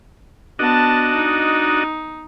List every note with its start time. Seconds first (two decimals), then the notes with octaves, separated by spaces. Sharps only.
0.59 B3 D4 F#4 D#5 A5
1.15 D#4